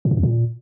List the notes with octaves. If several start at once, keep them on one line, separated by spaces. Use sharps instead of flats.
A2
G#2
E2
A#2